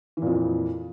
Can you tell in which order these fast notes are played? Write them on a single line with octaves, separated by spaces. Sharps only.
E3 A#2 F2